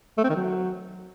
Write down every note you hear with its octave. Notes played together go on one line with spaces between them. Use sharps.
A3
C4
D#3
F#3